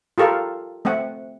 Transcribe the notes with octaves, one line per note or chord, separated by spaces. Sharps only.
F4 G4 A4 A#4 F5
A3 C4 E5 F#5